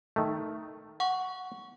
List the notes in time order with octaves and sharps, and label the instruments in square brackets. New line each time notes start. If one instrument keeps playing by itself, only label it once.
[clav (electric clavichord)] D#3 A3
[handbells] F#5 C#6